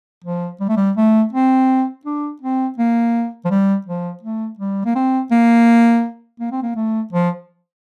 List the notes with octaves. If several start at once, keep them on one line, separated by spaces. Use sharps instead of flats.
F3
G3
A3
G3
A3
C4
D4
C4
A#3
F3
G3
F3
A3
G3
A#3
C4
A#3
A#3
C4
A#3
A3
F3